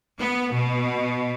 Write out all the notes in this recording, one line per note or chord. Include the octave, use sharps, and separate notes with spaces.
B3
B2